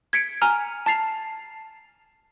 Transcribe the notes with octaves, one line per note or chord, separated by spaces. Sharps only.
G#6 B6 C#7 D7
G#5 A#5 F6
A5 A6 C7 F7